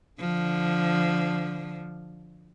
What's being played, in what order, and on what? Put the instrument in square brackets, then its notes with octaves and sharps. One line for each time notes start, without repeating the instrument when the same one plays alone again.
[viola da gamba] D3 F3